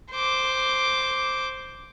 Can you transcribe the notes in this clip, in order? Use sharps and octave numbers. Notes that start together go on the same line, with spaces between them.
C5 D6